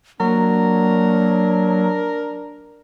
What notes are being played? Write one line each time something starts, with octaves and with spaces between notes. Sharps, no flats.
F#3 A#3 D4 A#4